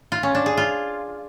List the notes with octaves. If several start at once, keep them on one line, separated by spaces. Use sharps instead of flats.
F4
C#4
D4
G#4
F4